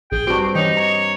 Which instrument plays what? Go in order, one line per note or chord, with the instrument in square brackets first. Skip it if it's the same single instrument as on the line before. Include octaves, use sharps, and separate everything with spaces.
[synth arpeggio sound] A#1 [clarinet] G#4 [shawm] G5
[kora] G2 C4 [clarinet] F#4 [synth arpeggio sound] D6 C7 D7
[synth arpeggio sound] E3 C#4 [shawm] D#4 [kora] G4 [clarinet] D#5
[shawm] C#5 [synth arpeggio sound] A#5